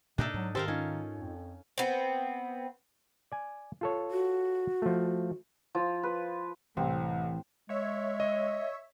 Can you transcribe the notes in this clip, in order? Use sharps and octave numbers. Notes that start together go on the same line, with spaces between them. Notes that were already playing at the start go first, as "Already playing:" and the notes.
A2 C3 A#3 D4 D#4 A4
G#2 F#3
D#3 G4 A4 A#4 C5 F5
C#4 D#4 F4
F2
B3 C4
D5 G#5
F4 A4 C#5
F#4
F3 A3
F3
B4
C2 A2 E3 C4
G#3 C#5 E5
D#5